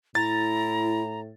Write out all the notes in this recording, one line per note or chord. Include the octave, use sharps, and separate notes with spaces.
A2 E4 A#5 A6